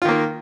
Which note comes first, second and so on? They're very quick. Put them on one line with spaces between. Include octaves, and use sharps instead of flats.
F4 D#3 A#3